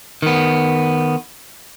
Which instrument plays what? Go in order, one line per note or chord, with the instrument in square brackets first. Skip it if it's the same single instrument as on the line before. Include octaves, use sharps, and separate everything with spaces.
[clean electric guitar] D#3 B3